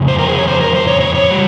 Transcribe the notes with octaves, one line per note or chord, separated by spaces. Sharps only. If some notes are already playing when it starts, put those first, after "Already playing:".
Already playing: F2 C#3
C5
A#4
G#4
C#5
C5
A#4
C5
C#5
C#5
C#5
G3